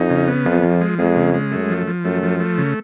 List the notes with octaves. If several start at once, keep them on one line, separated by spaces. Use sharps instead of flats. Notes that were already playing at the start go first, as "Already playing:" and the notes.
Already playing: F2 D#4
C#3
B3
F2 F3
F3
G#3
F2 G#3
C#3
G#3
F#2 A3
F3
F3
F#2 A3
F3
A3
C#3